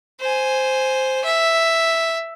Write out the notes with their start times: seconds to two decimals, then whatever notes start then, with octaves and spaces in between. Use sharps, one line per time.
0.20 C5 G#5
1.24 E5